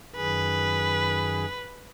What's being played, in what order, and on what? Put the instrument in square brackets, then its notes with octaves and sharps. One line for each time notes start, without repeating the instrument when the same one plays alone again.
[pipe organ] F#2 D#3 G#4 [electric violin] B4